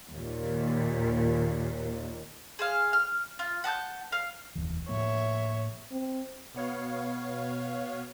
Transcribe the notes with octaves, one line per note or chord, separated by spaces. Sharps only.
D#2 A#2
G#4 C5 F5
F6
F4
F#5 A5 D#6 G6
F5
F1 D#2 E3
A2 F3 A#3 C#5 E5
C4
B2 B3 C#5 F5